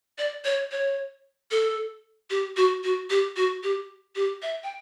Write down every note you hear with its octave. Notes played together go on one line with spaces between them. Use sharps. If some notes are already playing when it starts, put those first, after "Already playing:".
D5
C#5
C#5
A4
G4
F#4
F#4
G4
F#4
G4
G4
E5
G5